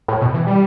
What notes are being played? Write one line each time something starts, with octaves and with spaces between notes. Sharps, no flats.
A2
B2
E3
G3